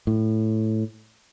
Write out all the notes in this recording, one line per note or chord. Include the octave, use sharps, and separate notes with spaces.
A2